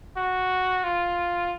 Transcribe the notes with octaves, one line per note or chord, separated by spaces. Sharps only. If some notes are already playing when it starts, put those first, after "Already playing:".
F#4
F4